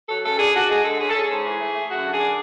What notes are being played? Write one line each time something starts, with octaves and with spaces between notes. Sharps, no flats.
F#3 A4
C#3 A4
D4 G#4
D4 F#4
G#3 G#4
D3 A4
C#4 G#4
A4
C#4 G#4
G#2
E3
A3
A3
F#2 F#4
D3
G#4
D4